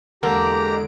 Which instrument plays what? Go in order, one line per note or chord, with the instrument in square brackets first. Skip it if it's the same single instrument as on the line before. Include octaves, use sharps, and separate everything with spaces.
[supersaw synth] E2 G#3 D7 [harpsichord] D3 [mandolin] A#3 [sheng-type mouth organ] G4 A#5